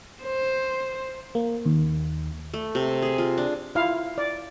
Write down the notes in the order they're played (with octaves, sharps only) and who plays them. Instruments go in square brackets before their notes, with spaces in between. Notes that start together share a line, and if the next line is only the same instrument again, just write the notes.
[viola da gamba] C5
[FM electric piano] A#3
D#2
[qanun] A3
C3
G#4
F4
D4
[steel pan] E4 F4 F5
D5